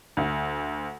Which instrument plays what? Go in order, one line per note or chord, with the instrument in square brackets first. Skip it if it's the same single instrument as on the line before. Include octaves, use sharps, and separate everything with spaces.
[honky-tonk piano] D2